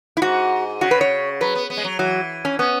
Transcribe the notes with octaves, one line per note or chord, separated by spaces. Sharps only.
E4
G#2 F#4
C#3 F#4
B4
C#5
F#3 B4
B3
B3
G#3
F#3
E3 F#3
C#4
B3 C#4